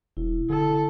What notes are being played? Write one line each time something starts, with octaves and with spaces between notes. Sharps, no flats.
E1 E4
D3 A4